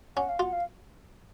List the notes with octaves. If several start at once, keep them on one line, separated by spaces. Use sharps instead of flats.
C#4 F#5
F5
F4 F#5
F5